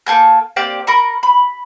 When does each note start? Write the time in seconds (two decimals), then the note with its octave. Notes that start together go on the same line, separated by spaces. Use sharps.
0.07 A#3 A4 G#5 G6
0.56 A#3 C4 G4 D5
0.87 A#4 B5 C#6
1.23 B5